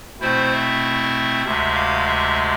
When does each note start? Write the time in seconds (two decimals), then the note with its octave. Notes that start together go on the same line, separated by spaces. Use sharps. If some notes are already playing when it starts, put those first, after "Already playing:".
0.21 B2 A3 C4 E4 C5
0.52 E5
1.45 D2 C3 G#3 E5
1.75 F5
2.06 E5